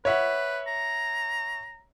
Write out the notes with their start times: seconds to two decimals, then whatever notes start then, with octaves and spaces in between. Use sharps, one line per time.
0.05 B4 C#5 E5 F#5
0.67 A#5